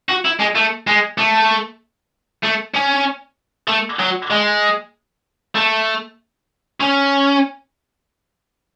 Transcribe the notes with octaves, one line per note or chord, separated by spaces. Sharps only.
F#4
E4
G#3
A3
G#3
A3
A3
C#4
A3
F#3
G#3
A3
C#4